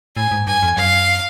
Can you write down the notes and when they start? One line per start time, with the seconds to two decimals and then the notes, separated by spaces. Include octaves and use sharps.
0.16 A2 G#5
0.31 G#2
0.47 G2 G#5
0.63 F2
0.77 F#2 F5